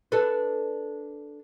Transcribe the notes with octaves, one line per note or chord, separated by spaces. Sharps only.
D4 A4 B4